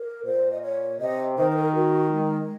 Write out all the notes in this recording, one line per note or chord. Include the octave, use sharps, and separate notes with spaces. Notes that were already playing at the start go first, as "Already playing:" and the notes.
Already playing: A#4
A#2 C5
D#5
C#5
C3 D#5
D#3 C5
C5
A#4
F#4
G#3